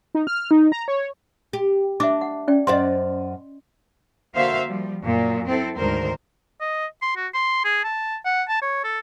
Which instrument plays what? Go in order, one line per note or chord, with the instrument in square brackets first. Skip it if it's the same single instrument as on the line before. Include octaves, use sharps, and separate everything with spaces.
[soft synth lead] D#4
F6
D#4
A#5
C#5
[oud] G4
[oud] D4 [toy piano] E5 D6
[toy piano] F#5
C#4 D5 G5
[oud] F#2 C5 D5 [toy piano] D#5 F5 C6
[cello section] D3 A#3 F#4 C5 E5 F5
F3 G3
F#2 A#2
C4 E4 A4
D2 G#2 D#3 A#4 C5
[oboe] D#5
C6
F#4
C6
G#4
A5
F#5
A5
C#5
A4